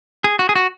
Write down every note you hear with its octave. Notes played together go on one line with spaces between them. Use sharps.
G#4
F#4
G#4
F#4